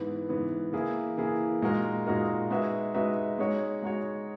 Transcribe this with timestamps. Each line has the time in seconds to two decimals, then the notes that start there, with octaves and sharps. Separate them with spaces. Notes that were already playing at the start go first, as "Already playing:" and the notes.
Already playing: G#2 E3 B3
0.29 G#2 E3 B3
0.73 E3 A#3 E4 G#4
1.18 E3 A#3 E4 G#4
1.62 A#2 G#3 D#4 F#4 A#4
2.07 A#2 G#3 D#4 F#4 A#4
2.50 G#3 D#4 F#4 B4 E5
2.94 G#3 D#4 F#4 B4 E5
3.39 G#3 D#4 F#4 C#5
3.82 G#3 D#4 F#4 C#5